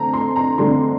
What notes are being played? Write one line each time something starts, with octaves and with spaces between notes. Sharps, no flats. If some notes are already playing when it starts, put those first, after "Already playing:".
Already playing: D3 C4 A5 A#5
C6
A#5
D3 G3 C4 C6